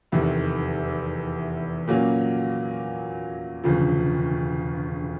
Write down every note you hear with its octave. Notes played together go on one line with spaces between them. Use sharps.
F1 E2 C3 D#3
A#2 F#3 A#3 C#4 F#4
E1 D2 C#3 F3